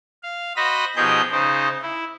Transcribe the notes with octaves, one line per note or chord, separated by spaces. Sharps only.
F5
F#4 C5 D#5 B5 A#6
B2 F3 D#4 G4 G#4 G6
C#3 D#4 C5
E4